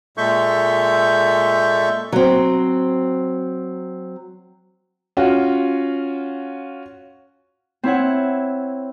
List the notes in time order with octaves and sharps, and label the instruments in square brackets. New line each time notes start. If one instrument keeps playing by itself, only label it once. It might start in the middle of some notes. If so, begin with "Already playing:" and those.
[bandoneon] A#2 G#3 A4 E5 C#6 G6
[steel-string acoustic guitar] F#3 C4
[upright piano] C#4 F4 F#4
[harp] C4 E4 C#5 F#5